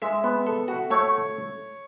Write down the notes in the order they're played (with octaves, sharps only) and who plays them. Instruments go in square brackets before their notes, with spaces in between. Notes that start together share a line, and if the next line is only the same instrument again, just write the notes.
[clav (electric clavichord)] G#3 [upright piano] E5
[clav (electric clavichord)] B3
A4
F#4
[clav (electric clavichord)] A3 [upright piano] C#5